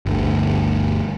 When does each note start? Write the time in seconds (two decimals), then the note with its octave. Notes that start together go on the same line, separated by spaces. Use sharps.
0.06 G1 D2